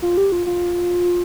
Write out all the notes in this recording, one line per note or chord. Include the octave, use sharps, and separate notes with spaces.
F4
G4
F4
F4